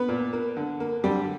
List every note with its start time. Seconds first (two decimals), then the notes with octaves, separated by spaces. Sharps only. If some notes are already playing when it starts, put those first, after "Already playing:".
Already playing: B3 B4
0.09 A#2
0.33 A#3
0.57 D3
0.80 A#3
1.04 D3 G3 G4